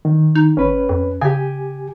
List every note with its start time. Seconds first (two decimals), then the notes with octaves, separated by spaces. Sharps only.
0.05 D#3
0.35 D#4
0.57 G#1 C#4 B4
0.89 F2
1.22 C#3 G4 G#5